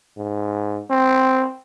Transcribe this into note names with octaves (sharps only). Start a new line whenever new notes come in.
G#2
C4